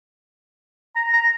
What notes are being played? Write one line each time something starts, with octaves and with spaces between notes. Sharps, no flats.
A#5
A#5